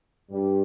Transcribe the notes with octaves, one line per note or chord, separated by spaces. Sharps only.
G2 G3